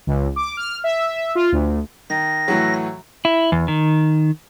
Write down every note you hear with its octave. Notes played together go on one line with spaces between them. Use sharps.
C#2
D6
F6
E5
F4
D2
D#3 A#6
A2 E3 F#3
E4
E2
D#3